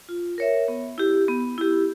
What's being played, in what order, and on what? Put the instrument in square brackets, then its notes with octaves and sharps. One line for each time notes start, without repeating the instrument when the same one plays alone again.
[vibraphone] F4
A#4 C#5 E5
B3
E4 G4
B3
E4 G4